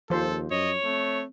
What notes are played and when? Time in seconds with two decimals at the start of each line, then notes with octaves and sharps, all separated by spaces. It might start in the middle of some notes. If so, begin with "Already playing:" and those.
0.10 D#2 F3 A4 C5
0.51 F#2 C#5 D#5
0.84 A3 C4